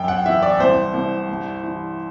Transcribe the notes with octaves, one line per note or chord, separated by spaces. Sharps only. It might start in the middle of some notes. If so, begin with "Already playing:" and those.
Already playing: F#2 G5
F#5
E3 E5
D5
C2 C5
C2
G2
E3